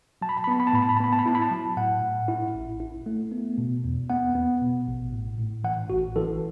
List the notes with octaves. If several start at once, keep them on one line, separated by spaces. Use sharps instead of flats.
F#3 A5
B5
A5
B5
B3 A5
B5
A5
A2 B5
A5
B5
A5
B3 B5
A5
B5
E4 A5
B5
A5
F#3
A2 F#5
A2
E4
A1
E4
A3
B3
B2
E2
B3 F#5
B3
B2
A1
A2
A2
E3 F#5
A1 F#4
E3 A4